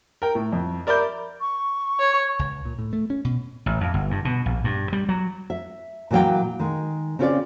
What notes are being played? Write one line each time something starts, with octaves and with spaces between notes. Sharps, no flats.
A#4 G5
A2
F2
A#4 D5 E5 B5 G6
C#6
C#5
C#2
A#2
A2
A3
C#4
B2
A1
F2
G1
G2
B2
A#1
G2
G3
F#3
E5
A#2 E3 F#3 D5 F5 G5
D#3 G#3
C#3 C4 C#4 F4 C#5 D5